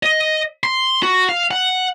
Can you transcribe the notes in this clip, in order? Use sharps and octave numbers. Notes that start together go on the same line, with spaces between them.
D#5
C6
F#4
F5
F#5